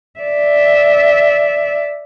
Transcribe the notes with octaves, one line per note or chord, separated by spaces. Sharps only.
D5 E5